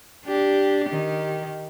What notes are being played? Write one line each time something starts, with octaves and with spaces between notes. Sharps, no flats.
D4 G4
D#3 G4